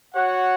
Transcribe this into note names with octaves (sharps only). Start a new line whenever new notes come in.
F#4 C#5 F#5